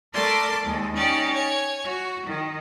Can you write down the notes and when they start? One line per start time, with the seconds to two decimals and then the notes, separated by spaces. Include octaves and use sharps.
0.12 A3 A#4 D5 A5 C6 D6
0.64 D#2 G#3
0.95 C#4 D#4 G4 D5
1.34 C#5 G#5
1.84 F#4
2.26 D#3